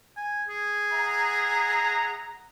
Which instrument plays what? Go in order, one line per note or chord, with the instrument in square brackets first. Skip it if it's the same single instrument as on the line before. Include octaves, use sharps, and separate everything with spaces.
[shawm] G#5
G#4
[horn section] E5 F#5 A#5